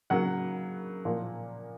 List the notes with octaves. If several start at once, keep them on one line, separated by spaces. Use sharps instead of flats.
C#3 F#3 A#3 F#5
A#2 F3 A#3